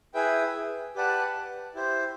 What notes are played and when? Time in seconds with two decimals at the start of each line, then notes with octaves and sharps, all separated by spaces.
0.14 E4 G#4 B4 E5 G5
0.95 G4 B4 D5 F#5 A5
1.75 E4 G4 C5